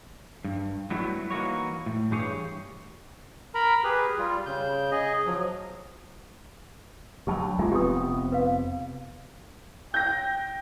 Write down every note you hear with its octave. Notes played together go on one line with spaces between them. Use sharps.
G2
F#3 G3 A3 B3 E4 F#4
E3 A#3 D#4 F#4 C#5
A2
G2 E3 G4 G#4 C#5
A#4 A#5 B5
G4 G#4 B4
G3 F4
C#3 G6
G#4 D#5
F3 F#3
D2 F#3 G3 G4 A5 B5
G#3 A#3 F4
F1 B3 C4 G4 B4 D#6
B4 F5
G5 G6 A#6